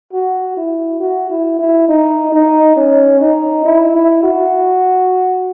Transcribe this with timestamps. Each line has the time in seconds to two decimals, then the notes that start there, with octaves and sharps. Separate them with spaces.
0.13 F#4
0.57 E4
1.01 F#4
1.30 E4
1.59 E4
1.88 D#4
2.32 D#4
2.77 C#4
3.21 D#4
3.65 E4
3.95 E4
4.23 F#4